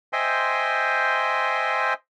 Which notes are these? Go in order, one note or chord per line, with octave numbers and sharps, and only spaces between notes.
C5 D#5 E5 G5 G#5 C6